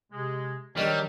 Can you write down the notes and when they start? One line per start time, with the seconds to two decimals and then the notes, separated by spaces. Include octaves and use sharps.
0.13 C3 G#3
0.77 D#3 F#3 G3 D4 G4 F6